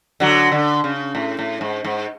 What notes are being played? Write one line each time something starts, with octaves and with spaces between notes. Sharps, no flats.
D3 F#3
D3
C#3
A2
A2
G#2
G#2